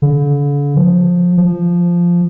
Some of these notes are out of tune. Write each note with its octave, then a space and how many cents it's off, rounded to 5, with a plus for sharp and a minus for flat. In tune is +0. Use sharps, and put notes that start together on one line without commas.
D3 -40
F3 +20
F3 -5